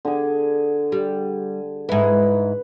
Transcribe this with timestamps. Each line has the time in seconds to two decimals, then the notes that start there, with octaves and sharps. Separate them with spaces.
0.05 D3 G#4
0.92 G3
1.89 G#2 E4 B4